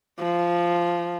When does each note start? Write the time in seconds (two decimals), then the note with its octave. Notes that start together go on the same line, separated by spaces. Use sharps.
0.20 F3